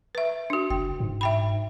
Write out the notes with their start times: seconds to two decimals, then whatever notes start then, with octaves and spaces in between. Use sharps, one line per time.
0.15 B4 E5
0.50 D4 F#4
0.70 F#1 G5
1.00 G#2
1.21 E5 G5 B5